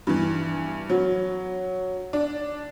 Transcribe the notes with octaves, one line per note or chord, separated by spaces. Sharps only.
G2 E3
F#3
D4